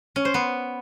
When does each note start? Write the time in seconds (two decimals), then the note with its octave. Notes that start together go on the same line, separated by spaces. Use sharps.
0.16 C#4
0.25 C5
0.34 B3